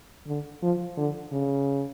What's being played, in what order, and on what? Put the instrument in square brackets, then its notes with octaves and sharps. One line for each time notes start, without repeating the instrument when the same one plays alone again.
[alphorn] D3
F3
D3
C#3